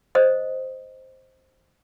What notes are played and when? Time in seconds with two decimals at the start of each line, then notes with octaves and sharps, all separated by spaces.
0.15 C5 D#5 D#6